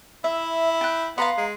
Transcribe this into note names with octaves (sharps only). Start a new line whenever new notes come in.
E4 E5
G5 F#6
B3 F5 A#5 C6
G#3